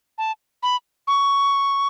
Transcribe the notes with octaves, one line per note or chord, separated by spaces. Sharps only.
A5
B5
C#6